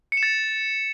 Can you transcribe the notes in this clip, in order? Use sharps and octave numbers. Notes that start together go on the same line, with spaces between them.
C#7
E7
A6